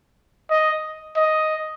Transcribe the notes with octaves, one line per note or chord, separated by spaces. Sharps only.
D#5
D#5